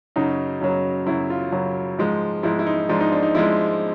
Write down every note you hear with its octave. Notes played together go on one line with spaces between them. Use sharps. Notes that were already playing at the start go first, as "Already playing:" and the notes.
F#2 C#3 F#3 D#4
F#2 C#3 F#3
F#2 C#3 F#3 E4
F4
F#2 C#3 F#3
G#2 F3 G#3
G#2 F3 G#3 E4
E4
D#4
G#2 F3 G#3 D4
D#4
D4
D#4
F3 G#3 E4